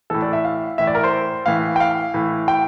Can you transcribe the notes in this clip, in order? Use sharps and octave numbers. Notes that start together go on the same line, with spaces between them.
A2 E3 A4
D5
E5
F5
A2 E3 E5
D5
A#4
C5
A2 E3 F5
G5
F5
A2 E3
G5